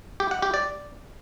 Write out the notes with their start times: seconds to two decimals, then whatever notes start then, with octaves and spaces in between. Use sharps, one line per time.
0.20 G4
0.31 F#5
0.42 G4
0.54 D5